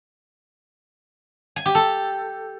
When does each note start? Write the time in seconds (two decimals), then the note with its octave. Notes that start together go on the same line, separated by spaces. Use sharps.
1.56 G#5
1.66 G4
1.75 A4